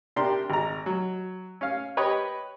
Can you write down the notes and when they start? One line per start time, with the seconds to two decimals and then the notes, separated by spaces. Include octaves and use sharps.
0.16 C3 D4 G4 A#4 C6
0.50 G#1 A#5
0.86 F#3
1.61 C#4 F5
1.97 G4 B4 C#5 D#5